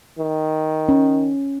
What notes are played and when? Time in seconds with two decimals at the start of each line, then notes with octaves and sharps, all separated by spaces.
0.19 D#3
0.89 C#4